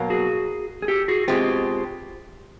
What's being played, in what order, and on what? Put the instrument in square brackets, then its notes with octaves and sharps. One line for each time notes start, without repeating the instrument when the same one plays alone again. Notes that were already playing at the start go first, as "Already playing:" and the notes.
Already playing: [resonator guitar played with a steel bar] B2 F#3 A#3
[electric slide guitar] F#4 G#4
G#4
G4 A4
F#4 G#4
[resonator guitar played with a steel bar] B2 G#3 C4 [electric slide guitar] F4 G4